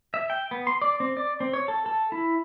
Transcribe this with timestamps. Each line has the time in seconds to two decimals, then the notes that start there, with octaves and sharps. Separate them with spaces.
0.14 E5
0.30 G5
0.51 B3
0.67 C6
0.82 D5
1.00 C4
1.17 D5
1.40 C4
1.53 C#5
1.68 A4
1.86 A4
2.12 E4